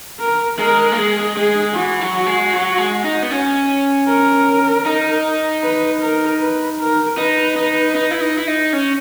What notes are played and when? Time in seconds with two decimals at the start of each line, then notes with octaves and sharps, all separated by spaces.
0.20 A#4
0.59 G#3 A#4
0.92 A#3
0.97 G#3 G#4
1.36 G#3 G#4
1.75 E3 F#4
2.01 F#3
2.27 G#3
2.53 F#3
2.78 G#3
3.04 D#4
3.23 B3
3.31 C#4
4.07 A#4
4.86 D#4
5.63 B4
6.01 A#4
6.41 B4
6.80 A#4
7.17 D#4 B4
7.56 D#4
7.95 D#4
8.11 E4
8.21 D#4
8.38 E4
8.47 D#4
8.73 C#4